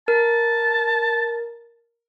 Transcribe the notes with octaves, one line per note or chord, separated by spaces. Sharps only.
A#4 A5